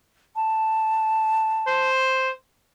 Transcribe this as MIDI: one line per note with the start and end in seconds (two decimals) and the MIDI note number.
0.36 1.89 81
1.67 2.31 72